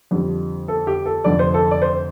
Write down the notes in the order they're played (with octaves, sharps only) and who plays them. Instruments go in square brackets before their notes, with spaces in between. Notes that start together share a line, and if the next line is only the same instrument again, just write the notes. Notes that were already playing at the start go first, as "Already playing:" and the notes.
[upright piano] F2 D3 G3
A4
G4
A4
F1 F2 D3 D5
C5
A4
D5
C5